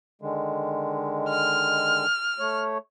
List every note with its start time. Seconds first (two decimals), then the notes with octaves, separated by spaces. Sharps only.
0.22 D3 D#3 G#3
1.30 F6
2.39 A3 C#5